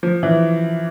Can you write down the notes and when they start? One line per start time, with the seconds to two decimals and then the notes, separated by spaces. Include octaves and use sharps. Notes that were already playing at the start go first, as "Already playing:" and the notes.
0.03 F3
0.23 E3